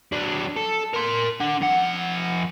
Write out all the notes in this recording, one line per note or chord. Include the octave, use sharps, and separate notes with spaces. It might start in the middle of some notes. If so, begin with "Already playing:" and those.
F#3 D4
A4
A#4 C6
D4 F#5
F2 F#5